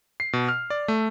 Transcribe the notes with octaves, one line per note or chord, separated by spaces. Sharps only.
C7
B2
F6
D5
A3